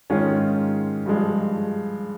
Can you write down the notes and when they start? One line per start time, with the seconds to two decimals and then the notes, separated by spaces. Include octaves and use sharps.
0.10 G#2 D#3 G#3 C#4 F4
1.06 G2 F3 G#3